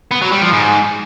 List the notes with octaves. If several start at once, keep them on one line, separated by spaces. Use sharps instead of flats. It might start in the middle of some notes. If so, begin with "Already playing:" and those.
B3
F#3
G3
F3
G#2